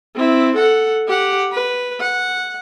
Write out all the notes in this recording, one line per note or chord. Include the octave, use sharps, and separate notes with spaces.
C4 E4
A4 F#5
G4 F#5
B4
F#5